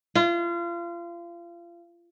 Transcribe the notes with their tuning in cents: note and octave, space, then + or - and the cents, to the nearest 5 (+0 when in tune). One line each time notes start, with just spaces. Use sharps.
F4 -30